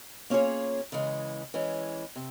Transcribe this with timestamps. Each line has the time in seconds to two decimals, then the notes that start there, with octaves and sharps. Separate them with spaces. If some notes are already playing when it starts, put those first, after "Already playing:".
0.30 A#3 C#4 F4 G#4 C#5
0.92 C#3 E3 G#3
1.54 E3 G#3 C#4
2.16 C3